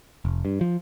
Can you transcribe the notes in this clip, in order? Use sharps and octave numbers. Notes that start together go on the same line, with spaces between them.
F1
G2
F3